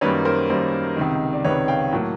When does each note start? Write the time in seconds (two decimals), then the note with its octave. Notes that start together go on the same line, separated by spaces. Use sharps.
0.01 F#2 D#3 G3 A#3 B4 C#5
0.25 A#4 C5
0.49 F#2 D#3 G3 A#3 A#4 C5
0.96 C#2 C3 D#3
1.33 D5
1.44 C#2 C3 D#3 B4 C#5
1.68 F5 G5
1.92 A2 F#3 A#3